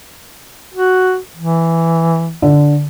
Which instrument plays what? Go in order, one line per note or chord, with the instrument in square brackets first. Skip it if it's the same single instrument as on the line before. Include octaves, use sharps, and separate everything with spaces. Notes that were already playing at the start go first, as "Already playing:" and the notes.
[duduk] F#4
E3
[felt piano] D3